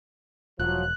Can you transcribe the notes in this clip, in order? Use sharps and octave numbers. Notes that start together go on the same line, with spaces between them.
E1 F3 F#3 F#6